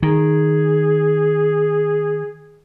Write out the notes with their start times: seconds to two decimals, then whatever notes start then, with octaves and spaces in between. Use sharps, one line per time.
0.03 D#3 G#4